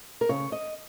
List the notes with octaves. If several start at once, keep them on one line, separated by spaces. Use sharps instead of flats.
A#4
C#3 C#5
D#5